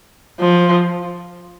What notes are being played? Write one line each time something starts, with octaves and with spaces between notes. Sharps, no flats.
F3